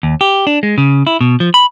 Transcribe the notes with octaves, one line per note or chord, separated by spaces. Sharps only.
D#2
G4
D4
G#3
C#3
E4
B2
F3
B5